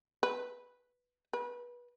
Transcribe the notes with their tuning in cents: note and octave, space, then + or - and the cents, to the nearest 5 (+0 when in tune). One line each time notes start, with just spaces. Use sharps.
B4 -5
B4 -25